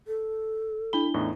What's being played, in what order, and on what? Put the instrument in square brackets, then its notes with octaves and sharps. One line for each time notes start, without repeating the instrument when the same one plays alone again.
[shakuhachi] A4
[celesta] D4 E4 G7 [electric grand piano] B5
[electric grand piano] E2 A2 D#4